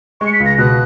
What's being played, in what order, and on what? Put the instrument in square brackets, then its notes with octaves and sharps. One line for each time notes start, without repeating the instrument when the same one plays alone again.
[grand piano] G#3 [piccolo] C#6
[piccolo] C#7
B6
[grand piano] C#2
[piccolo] A#6
[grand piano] B2 [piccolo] F#6